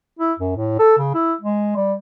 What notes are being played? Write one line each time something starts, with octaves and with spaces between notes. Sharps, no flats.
E4
F#2
A2
A4
C#3
E4
G#3
G3